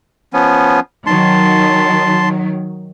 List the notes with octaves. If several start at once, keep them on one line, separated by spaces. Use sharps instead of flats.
F3 B3 C#4
D#3 F#3 A5 C6